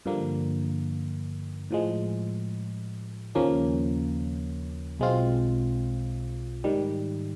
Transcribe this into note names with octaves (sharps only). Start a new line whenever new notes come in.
G2 D3 F3 A#3
A2 F3 G#3
D#2 C#3 F3 A#3 C#4
B1 B2 G#3 C4 F4
G#2 D#3 G3